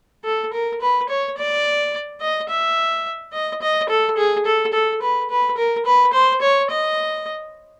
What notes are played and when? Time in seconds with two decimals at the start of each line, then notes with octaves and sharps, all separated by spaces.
0.25 A4
0.53 A#4
0.81 B4
1.09 C#5
1.38 D5
2.21 D#5
2.49 E5
3.33 D#5
3.62 D#5
3.90 A4
4.18 G#4
4.46 A4
4.73 A4
5.02 B4
5.30 B4
5.57 A#4
5.86 B4
6.13 C5
6.42 C#5
6.70 D#5